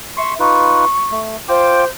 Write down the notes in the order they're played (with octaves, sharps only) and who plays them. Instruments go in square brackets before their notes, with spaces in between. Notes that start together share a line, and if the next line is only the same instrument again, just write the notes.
[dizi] E5 [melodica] C6 C#6
[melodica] D#4 F4 B4 [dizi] C#6
[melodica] A3
[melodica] F4 G5 D6 [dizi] C5